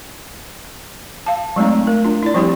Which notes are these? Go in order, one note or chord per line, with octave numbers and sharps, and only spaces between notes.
F5 A5
F#3 G#3 A3 C4 D#4
A3 A#4
D4 F4
E4 D5
F3 G3 C4 E4 G4